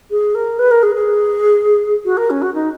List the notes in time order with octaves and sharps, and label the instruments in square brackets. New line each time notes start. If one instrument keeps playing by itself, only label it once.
[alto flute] G#4
A#4
B4
A#4
G#4
G#4
F#4
A#4
C#4
F#4
D#4